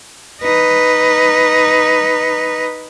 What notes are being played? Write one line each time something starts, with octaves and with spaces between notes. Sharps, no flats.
D#4 B4